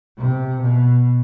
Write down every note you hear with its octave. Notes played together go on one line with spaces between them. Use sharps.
C3
B2